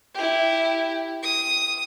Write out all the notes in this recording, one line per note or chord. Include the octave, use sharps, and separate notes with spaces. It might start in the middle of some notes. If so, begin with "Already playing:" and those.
E4 G4
D#6